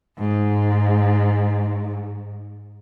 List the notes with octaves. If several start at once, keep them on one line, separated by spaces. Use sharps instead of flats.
G#2